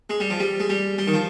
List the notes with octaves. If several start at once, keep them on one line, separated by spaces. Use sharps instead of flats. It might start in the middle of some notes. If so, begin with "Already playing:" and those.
G#3
G3
F3
G3
G#3
G3
G3
D#3
F3